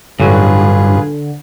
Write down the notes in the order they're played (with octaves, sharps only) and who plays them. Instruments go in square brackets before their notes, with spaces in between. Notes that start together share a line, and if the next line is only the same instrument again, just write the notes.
[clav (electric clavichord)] A1 F#3 [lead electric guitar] G2 [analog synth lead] D3 [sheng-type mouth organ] F4 G#4 B4